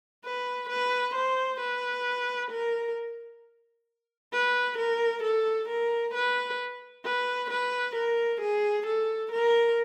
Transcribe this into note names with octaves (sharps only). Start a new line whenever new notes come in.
B4
B4
C5
B4
A#4
B4
A#4
A4
A#4
B4
B4
B4
A#4
G#4
A4
A#4